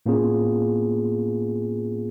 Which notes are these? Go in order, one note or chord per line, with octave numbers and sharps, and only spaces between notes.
A2 A#3 B3 C#4 F4 G#4